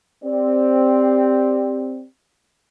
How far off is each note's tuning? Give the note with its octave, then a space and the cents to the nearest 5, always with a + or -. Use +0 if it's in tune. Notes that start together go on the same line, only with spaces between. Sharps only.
C4 +0 G4 +15 D5 +0